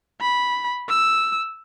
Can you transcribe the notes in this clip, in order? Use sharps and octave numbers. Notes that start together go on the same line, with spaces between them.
B5
E6